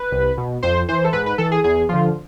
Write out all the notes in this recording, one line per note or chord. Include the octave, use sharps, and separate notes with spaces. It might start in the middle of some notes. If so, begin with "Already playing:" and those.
Already playing: B4
C2
B2
F2 C5
E3 C5
A4
G#2 B4
B4
E3 A4
G#4
E2 G#4
D3 F3 F4